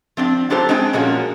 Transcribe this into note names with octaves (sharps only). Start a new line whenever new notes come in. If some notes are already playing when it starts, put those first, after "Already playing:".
F3 C4 D4
F#3 D4 F4 G4 A4 C5
G#3 C4 D4 G5 G#5
A#2 F3 G#3 A#3 C#4 F#4